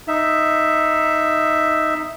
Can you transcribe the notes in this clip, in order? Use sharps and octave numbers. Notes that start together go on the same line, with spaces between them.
D#4 E5